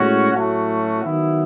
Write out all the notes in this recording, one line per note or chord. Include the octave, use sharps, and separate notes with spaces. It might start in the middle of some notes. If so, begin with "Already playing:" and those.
Already playing: A2 G#3 C#4 F#4
A2 F#3 A3 C#4 F#4
D#3 F#3 B3 E4